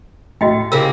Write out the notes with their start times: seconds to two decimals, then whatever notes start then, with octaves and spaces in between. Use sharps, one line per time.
0.41 A2 F#4 D#5 G5
0.72 C#3 A#3 E4 F4 G4 E6